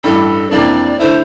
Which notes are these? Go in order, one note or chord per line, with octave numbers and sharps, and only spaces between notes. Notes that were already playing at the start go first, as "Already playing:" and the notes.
A1 G2 E3 G3 D4 A4
F2 C3 E3 A#3 D4 D5
D3 A3 E4 C5